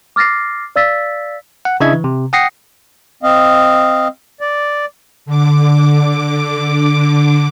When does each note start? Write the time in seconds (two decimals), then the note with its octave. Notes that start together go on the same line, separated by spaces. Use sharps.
0.16 D6 F6 A6 A#6 C7
0.76 D5 F5 E6 A6 B6
1.65 F#5
1.80 C#3 D4 E4 D#5 E5 G#6
1.93 E3
2.04 C3
2.33 F#5 G5 D#6 A#6 C7 C#7
3.23 C4 D#5 F5
4.41 D5
5.26 D3 D6